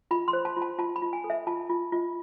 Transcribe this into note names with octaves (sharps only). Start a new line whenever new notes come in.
F4 B5
C6
C5
A5
F4
A5
F4 A5
B5
F4
G#5
A4
E5
F4 A5
F4
F4